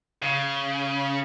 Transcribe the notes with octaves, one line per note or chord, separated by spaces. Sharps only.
C#3